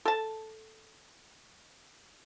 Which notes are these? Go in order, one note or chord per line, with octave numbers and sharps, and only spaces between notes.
A4 A5